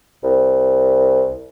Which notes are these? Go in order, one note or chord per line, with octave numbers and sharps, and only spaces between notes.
C2